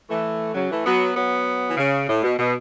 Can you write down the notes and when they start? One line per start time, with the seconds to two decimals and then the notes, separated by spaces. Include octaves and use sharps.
0.09 E3 A3
0.54 C#3 F#3
0.70 E3 A3
0.85 F#3 B3
1.15 F#3 B3
1.69 E3
1.77 C#3
2.07 A2
2.22 B2
2.38 B2